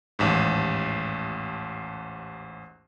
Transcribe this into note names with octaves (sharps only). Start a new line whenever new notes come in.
A1 D#2 G#2